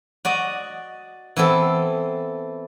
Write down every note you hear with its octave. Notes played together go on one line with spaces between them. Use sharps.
F#4 D5 D#5
E3 B3 C4 A4